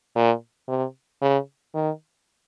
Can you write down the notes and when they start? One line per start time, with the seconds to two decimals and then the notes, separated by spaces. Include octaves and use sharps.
0.15 A#2
0.68 C3
1.22 C#3
1.74 D#3